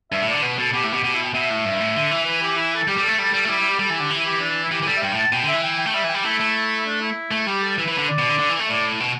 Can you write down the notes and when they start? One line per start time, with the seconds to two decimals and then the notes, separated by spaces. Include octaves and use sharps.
0.12 G2 E5
0.22 A2
0.28 D3 D5
0.42 B2 B4
0.58 B2 A4
0.73 B2 G4
0.84 A2
0.88 G4
0.93 B2
1.04 B2 G4
1.14 E4
1.24 G5
1.34 B2 E5
1.50 A2
1.65 G2
1.80 A2
1.96 D3
2.11 E3
2.26 B4
2.42 G4
2.56 E4
2.75 A4
2.88 G3 G4
2.98 G3 A4
3.08 A3
3.18 G3 A4
3.34 G3 A4
3.45 A3
3.48 G3 E4
3.59 E4
3.70 G4
3.79 G3 A4
3.90 E3
3.95 D3 G4
4.10 E3
4.17 E4
4.26 G4
4.41 D4
4.63 E4
4.71 E3 G4
4.82 E3
4.86 G3 A4
4.97 E5
5.02 G2 G5
5.12 A2
5.18 A5
5.33 B2 G5
5.43 D3
5.48 E5
5.53 E3
5.63 G5
5.79 G5
5.86 A3
5.94 G3 E5
6.04 E3 G5
6.15 G3
6.24 A3 E4
6.40 A3
6.86 D4
7.01 E4
7.31 A3
7.47 G3 G4
7.63 A4
7.78 E3 B4
7.88 E3
7.92 B4
7.98 D3
8.09 D5
8.18 B2
8.28 D3
8.39 D3
8.49 E3
8.59 A3
8.69 A2 D5
9.00 B2